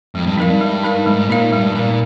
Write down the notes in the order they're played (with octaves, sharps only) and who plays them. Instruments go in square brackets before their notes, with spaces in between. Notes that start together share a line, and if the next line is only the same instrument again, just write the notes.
[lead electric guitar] F2 [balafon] G#3
[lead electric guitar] G2
[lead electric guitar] F2 [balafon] D#4 A#4 F5
[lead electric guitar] G2
[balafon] G#3
D#4 A#4 F5
[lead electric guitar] G#2 [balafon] G#3
[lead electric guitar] A#2 [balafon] D#4 A#4 F5
[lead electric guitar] G2 [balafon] G#3
[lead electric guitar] A#2 [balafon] D#4 A#4 F5